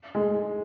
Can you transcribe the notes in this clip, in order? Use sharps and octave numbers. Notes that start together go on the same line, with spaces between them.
G#3